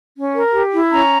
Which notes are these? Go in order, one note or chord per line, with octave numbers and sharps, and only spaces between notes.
C#4
A#4
G4
E4
C#4 A#5